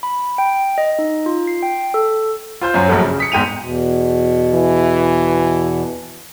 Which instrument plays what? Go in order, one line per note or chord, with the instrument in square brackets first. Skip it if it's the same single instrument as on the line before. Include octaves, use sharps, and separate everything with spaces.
[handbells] B5
G5
D#5
D#4
F4
C7
G5
A4
[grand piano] F4 C5 G6
F#2 F#3 C5
A#1 G2 F3 F#3 A3
C#3
D#6 B6 C#7
E2 G#2 G5 D#7 F7
[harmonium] E2 B2
[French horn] E3